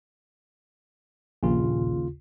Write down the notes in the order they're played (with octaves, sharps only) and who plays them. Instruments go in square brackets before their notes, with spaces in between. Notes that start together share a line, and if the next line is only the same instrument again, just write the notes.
[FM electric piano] A#1 [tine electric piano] D#2 C#3 F4